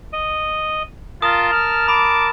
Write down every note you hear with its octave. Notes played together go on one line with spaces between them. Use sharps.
D#5
F4 A#4 A5 D#6
F6
B5 D6